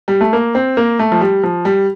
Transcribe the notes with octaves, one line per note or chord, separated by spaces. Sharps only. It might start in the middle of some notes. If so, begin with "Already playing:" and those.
G3
A3
A#3
C4
A#3
A3
F3
G3
F3
G3